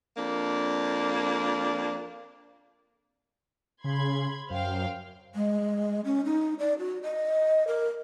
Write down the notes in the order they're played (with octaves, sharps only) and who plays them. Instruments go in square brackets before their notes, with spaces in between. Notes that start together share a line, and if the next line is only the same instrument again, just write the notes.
[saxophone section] F2 A#3 D4
[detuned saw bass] C#3 [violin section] B5 C6 G#6
[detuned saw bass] F#2 [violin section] C5 F5 G5
[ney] G#3
C#4
D#4
D5
F#4
D#5
A#4